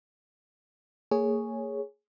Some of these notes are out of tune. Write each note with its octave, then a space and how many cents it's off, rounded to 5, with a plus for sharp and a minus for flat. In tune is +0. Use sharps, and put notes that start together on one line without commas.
A#3 -30 G#4 +0 C#5 +0